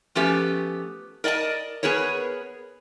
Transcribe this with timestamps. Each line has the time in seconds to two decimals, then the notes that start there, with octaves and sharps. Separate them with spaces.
0.15 F3 A3 B3 C#4 G4
1.24 A#4 D5 D#5 G5 A5
1.83 B3 G#4 A#4 B4 C#5